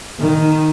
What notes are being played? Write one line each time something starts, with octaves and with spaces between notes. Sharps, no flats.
D#3